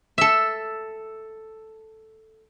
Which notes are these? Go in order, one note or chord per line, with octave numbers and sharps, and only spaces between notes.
A4 E5